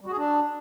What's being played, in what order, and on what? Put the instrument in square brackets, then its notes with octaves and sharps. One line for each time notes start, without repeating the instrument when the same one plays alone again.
[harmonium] G3
F#4
G#4
D4